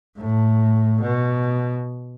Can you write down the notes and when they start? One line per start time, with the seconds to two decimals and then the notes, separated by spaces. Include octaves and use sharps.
0.18 A2
1.01 B2